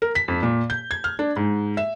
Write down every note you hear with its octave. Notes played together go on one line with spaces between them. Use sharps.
A#4
B6
F2
A#2
G6
G#6
F6
D4
G#2
E5